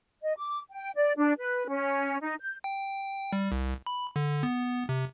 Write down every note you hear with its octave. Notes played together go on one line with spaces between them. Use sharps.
D#5
D6
G5
D5
D4
B4
C#4
D#4
G6
G5
G3
C2
B5
D3
B3
C3